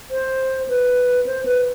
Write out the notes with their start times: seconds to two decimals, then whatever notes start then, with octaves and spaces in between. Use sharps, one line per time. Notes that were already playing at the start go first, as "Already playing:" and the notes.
0.11 C5
0.69 B4
1.26 C5
1.46 B4